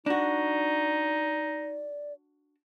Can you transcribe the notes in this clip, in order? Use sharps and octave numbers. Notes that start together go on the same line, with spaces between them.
D4 D#4 F#4 D5